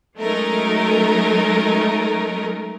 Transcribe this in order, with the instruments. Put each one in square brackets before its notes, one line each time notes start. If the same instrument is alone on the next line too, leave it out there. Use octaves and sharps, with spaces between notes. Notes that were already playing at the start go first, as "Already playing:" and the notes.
[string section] F#3 G#3 A3 C#4 D#4 A#4